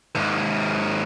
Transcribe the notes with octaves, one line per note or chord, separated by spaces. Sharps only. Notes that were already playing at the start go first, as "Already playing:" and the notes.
D#2 G#2